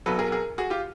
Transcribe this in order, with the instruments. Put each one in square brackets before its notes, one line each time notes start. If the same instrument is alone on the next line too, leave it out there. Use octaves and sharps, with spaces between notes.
[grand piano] B1 B2 F#3 A4 B4
G#4 A#4
G#4 A#4
F#4 G#4
F4 G4